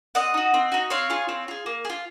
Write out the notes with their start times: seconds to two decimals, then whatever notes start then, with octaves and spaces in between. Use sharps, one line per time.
0.15 C4 D#5 F#5
0.34 D#4 F#4
0.54 C4
0.72 D#4 F#4
0.90 C4 C#5 F5
1.10 F4 G#4
1.29 C4
1.48 F4 G#4
1.66 A#3
1.85 G#4
1.90 F4